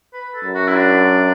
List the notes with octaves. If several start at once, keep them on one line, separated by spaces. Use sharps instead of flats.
B4
A4
F#2
F#4
E4
D4